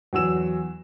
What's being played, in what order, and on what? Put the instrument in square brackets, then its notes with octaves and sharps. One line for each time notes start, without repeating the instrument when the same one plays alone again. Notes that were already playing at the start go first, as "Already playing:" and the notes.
[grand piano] E2 F#3 F#4 E6 E7